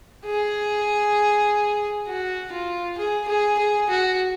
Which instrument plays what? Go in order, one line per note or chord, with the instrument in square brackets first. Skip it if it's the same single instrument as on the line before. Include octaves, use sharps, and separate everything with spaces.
[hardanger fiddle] G#4
F#4
F4
G#4
G#4
G#4
F#4